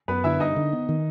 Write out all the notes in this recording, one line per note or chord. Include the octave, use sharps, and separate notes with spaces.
F#2 B3 B4
D3 E4 E5
G2 D#4 D#5
D3
B3
D#3